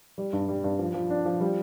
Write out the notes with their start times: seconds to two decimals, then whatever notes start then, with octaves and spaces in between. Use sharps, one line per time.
0.18 G3
0.33 G2
0.48 G3
0.64 G2
0.79 F3
0.94 F3
1.10 D4
1.25 F3
1.41 G3